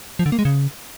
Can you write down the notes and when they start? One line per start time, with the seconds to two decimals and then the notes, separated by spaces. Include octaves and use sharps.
0.19 F3
0.26 D3
0.32 A#3
0.39 G#3
0.45 C#3